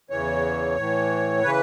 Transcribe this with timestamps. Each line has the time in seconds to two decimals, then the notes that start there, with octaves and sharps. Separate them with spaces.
0.10 E2 C#3 E3 C#5
0.76 A2 E3
1.44 C#3 E3 B4